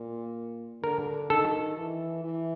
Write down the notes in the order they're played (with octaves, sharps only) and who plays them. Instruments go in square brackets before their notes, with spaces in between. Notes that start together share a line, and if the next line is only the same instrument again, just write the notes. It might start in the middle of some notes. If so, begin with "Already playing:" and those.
Already playing: [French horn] A#2
[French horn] D3 [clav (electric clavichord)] A#4
[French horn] D#3 [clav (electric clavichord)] A4
[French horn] E3
E3